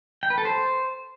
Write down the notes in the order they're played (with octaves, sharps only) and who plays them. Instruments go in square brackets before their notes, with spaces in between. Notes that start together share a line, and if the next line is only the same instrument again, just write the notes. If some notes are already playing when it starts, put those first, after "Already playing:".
[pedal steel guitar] G5
B4
A4
C5